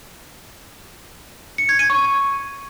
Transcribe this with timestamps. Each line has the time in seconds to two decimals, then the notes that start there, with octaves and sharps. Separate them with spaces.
1.58 C#7
1.69 G#6
1.79 D#7
1.90 C#6